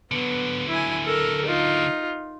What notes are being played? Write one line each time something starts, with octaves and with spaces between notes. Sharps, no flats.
D3 F#3 B3
E4 G#5
A4 A#4
D#4 F4